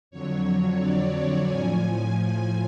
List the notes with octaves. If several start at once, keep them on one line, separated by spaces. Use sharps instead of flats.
F2 D3 F#3 C#5
D5
A2 F3 G#5